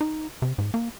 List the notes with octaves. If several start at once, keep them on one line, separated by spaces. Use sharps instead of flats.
D#4
C3
G#2
A#3